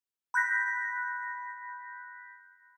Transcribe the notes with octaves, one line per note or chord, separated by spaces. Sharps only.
B5 F#6 G6 A#6 B6